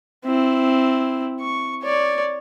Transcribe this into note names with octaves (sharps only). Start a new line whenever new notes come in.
C4 E4
C#6
C#5 D5